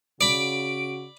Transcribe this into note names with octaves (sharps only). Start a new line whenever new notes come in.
C#3 F#4 D5 B5 D7